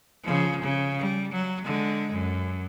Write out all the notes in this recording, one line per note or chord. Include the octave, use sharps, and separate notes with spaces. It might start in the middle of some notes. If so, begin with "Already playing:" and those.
C#3 F3
C#3
G3
F#3
D3 G#3
F#2